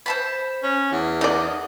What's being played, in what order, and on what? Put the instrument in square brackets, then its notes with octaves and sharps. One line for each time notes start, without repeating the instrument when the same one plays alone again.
[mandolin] C5 A5 B5
[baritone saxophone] C#4
E2
[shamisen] D#4 D5 [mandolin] D#5